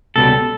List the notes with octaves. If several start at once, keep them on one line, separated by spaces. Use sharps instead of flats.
C#2 B2 G3 A4